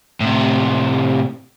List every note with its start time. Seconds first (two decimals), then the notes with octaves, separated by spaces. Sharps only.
0.20 A2 C3